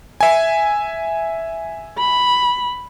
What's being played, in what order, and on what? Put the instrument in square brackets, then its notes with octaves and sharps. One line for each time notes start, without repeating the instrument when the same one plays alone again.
[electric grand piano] E5 G#5
[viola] B5